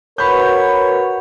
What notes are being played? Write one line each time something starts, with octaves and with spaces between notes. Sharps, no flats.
F#4 A#4 B4 C#5 F#5 B5 G6